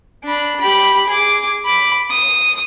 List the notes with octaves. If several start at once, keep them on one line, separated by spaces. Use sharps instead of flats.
D4 B5
G4 B5
G#4 D6
B5 D6
D#6